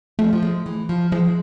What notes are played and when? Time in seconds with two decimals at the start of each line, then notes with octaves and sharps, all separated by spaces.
0.19 F3 A3
0.33 F3
0.43 G#3
0.66 E3
0.89 F3
1.12 F3 G#3